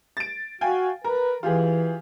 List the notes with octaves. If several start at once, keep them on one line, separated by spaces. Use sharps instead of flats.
A6 D7
F#4 F5 G5 G#5
A#4 B4 A#5
E3 F4 G4 G#4